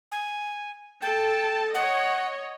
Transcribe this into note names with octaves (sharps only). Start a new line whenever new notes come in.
G#5
A4 G5 A5
C#5 D#5 F#5